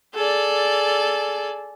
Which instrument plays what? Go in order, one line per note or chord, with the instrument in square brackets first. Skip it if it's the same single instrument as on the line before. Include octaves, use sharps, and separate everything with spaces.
[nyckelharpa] G#4 [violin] A4 D5